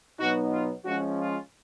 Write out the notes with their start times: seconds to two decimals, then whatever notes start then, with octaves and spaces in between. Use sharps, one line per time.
0.19 B2 F#3 B3 D#4 F#4
0.52 F4
0.84 F3 G#3 C#4 F#4
1.17 F4